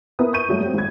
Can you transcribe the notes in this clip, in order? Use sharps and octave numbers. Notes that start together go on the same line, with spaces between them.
B3 E4 A#4 B4 D#6
C#6 G6 D#7
G2 F#3 A3
F#3 C4
G#1 G#6